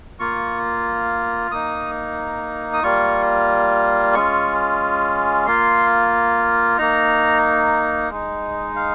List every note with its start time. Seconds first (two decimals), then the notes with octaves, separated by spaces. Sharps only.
0.19 A#3 F4 C#6
1.51 A#3 D#4 D#6
2.73 D#6
2.83 G3 A#3 F4 C#6
4.14 G#3 C#4 F4 C#6
5.47 A#3 F4 C6
6.78 A#3 D#4 A#5
8.10 G#3 D#4
8.76 F5